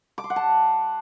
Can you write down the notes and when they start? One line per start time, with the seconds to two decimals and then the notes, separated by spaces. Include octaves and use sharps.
0.18 D6
0.24 C6
0.30 F#5
0.36 A5